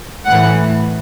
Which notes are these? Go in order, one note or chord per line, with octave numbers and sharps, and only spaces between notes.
A2 E3 F#5